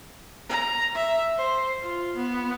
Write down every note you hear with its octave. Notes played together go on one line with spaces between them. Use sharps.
A#5
E5
C5
F4
B3